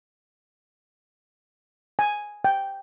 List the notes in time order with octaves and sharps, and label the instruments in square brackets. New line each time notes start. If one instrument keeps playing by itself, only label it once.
[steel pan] G#5
G5